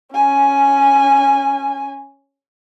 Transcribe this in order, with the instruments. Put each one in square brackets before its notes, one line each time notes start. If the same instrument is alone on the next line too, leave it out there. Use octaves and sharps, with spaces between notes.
[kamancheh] C#4 G#5